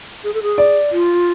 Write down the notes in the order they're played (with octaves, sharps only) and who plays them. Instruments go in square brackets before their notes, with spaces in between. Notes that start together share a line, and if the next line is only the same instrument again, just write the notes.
[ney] G#4
A4
G#4
[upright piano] D5
[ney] F4